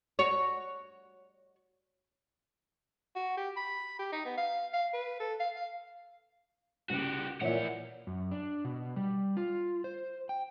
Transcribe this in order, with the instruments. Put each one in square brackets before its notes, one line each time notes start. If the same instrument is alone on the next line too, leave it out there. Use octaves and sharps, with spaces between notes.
[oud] F#4 C#5
[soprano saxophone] F#4
G4
B5
G4
D#4
B3
F5
F5
B4
A4
F5
F5
[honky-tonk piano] C2 C#3 A#3 [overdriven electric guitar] F#4 G4
[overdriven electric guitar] F2 F#5 [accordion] A#2 [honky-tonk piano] E3 E4 [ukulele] C#5 E5
[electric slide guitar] F#2
D4
B2
G3
F4
C5
G5